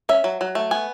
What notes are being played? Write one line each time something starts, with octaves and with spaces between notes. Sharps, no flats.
C#4 E5
F#3
F#3
A3
B3 G#5